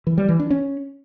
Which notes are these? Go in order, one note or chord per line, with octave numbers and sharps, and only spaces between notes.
E3
G3
E3
D4
C#4